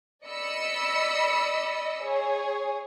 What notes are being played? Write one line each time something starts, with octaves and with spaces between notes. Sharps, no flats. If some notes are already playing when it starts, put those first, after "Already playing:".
D5 D#5 B5 E6 C#7
G#4 C#5